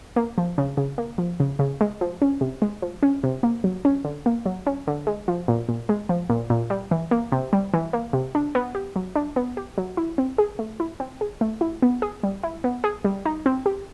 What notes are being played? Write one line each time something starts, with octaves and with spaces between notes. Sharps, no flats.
A#3
F3
C#3
C#3
A#3
F3
C#3
C#3
G#3
F3
C#4
C3
G#3
F3
C#4
C3
A#3
F#3
C#4
D3
A#3
F#3
C#4
D3
G#3
F3
A#2
A#2
G#3
F3
A#2
A#2
G3
E3
A#3
C3
G3
E3
A#3
C3
D4
B3
G4
F#3
D4
B3
G4
F#3
E4
C4
G#4
A3
E4
C4
G#4
A3
E4
B3
G#4
G3
E4
B3
G#4
G3
D#4
C4
G4